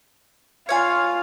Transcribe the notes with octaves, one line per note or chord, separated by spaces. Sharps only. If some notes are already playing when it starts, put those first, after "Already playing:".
F4 C#5 F5 G#5